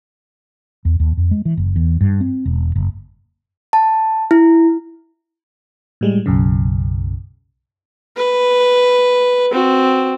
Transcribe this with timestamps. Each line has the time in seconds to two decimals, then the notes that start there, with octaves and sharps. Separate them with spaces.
0.85 E2
1.00 D#2
1.17 F2
1.31 G#3
1.45 E3
1.57 F#1
1.76 E2
2.01 G2
2.21 C4
2.46 E1
2.75 F#1
3.73 A5
4.31 E4
6.01 A2 G3 G#3
6.26 B1 F#2 C#3
8.16 B4
9.51 C4 F#4